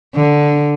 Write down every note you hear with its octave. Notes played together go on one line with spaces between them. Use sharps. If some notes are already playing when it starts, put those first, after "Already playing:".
D3